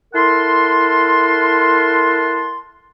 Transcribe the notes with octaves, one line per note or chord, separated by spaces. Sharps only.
E4 A4 A#4 F#5 A5 C6